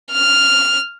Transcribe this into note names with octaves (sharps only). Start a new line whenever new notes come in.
F6